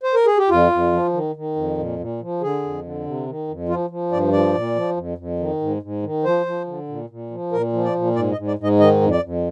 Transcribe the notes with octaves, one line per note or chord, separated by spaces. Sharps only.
C5
A#4
G#4
G4
F2 F4
F2
F3
D#3
D#3
F2
A#2
A#2
F3
D3 G#4
F2
D3
C3
D#3
F2
F3 F4
F3
G2 D5
F3 D5
A#2
F3
F2
F2
D#3
G#2
G#2
D#3
F3 C5
F3
D3
A#2
A#2
F3
A#2 A#4
F3
D5
A#2
G#2 D5
D#5
G#2
D5
G#2 D#5
D#3 D#5
F2
D5
F2